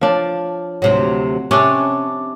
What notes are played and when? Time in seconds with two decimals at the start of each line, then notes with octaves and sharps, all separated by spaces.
0.01 F3 D4 C#5
0.82 D2 C3 F#3
1.51 C3 C#4 D4 D6